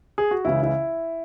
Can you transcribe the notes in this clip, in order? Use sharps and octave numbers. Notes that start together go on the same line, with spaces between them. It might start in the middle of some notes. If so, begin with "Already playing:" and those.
G#4
F#4
C#2 C#3 E3 E4
E4